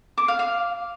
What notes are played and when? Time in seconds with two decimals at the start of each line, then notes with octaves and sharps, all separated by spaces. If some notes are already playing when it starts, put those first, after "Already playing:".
0.18 D6
0.28 F5
0.39 F5